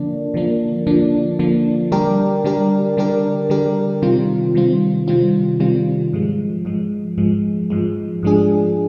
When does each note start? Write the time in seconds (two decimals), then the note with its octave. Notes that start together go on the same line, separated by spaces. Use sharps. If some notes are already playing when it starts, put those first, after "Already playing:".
Already playing: D3 F3 A#3 D4
0.34 D3 F3 A#3 D4
0.87 D3 F3 A#3 D4
1.39 D3 F3 A#3 D4
1.92 D3 G3 D4 G4 A#4
2.44 D3 G3 D4 G4 A#4
2.97 D3 G3 D4 G4 A#4
3.50 D3 G3 D4 G4 A#4
4.02 C3 D#3 G3 C4 F4
4.55 C3 D#3 G3 C4 F4
5.08 C3 D#3 G3 C4 F4
5.60 C3 D#3 G3 C4 F4
6.13 G#2 F3 G#3
6.65 G#2 F3 G#3
7.18 G#2 F3 G#3
7.70 G#2 F3 G#3
8.23 G#2 F3 G#3 D4 G#4